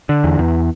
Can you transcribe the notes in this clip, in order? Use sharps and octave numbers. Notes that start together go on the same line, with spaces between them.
D3
E2
E2